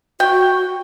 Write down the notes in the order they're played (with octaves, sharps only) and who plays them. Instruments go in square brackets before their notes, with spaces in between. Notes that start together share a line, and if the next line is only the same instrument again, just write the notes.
[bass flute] F#4 [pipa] G5